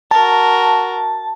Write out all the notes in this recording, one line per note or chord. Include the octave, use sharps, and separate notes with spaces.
F#4 A#4 A5